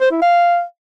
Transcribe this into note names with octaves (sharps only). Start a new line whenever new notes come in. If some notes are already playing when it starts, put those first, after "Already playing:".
C5
E4
F5